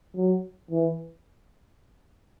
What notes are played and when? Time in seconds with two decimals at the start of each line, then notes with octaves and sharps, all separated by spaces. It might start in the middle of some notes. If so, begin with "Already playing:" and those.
0.16 F#3
0.71 E3